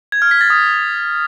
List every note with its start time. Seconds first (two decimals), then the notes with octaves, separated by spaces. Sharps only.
0.12 G#6
0.22 F6
0.31 B6
0.41 A6
0.50 D#6